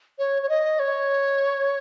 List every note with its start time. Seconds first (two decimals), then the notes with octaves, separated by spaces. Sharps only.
0.19 C#5
0.43 C#5
0.49 D#5
0.79 C#5